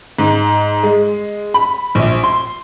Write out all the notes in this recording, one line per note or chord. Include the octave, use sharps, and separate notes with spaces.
G#2
G#3
B5
A#1
C6